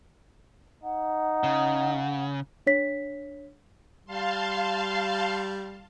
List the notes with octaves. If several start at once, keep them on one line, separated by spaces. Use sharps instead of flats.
D#4 F#5
C#3
D4 C#5 B6
G3 F5 A5 C6